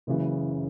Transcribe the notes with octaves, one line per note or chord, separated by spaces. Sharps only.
F#1 F#2 C#3 E3